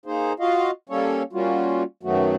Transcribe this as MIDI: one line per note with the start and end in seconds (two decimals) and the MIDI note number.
0.06 0.33 58
0.06 0.33 63
0.06 0.33 68
0.06 0.33 72
0.40 0.71 65
0.40 0.71 66
0.40 0.71 75
0.40 0.71 77
0.89 1.23 55
0.89 1.23 58
0.89 1.23 61
0.89 1.23 69
0.89 1.23 73
1.33 1.83 55
1.33 1.83 58
1.33 1.83 61
1.33 1.83 65
1.33 1.83 66
2.03 2.36 42
2.03 2.36 51
2.03 2.36 54
2.03 2.36 57
2.03 2.36 59
2.03 2.36 66